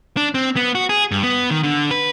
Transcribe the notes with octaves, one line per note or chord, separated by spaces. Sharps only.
D4
C4
B3
F#4
G#4
G2
B3
D#3
D3
B4